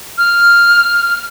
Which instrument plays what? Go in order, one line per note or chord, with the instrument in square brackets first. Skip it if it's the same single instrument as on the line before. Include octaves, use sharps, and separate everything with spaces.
[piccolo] F6